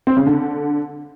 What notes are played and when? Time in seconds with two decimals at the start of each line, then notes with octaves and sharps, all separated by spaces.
0.07 C4
0.17 C#3
0.26 D3